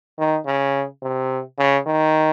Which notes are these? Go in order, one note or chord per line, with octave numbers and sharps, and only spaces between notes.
D#3
C#3
C3
C#3
D#3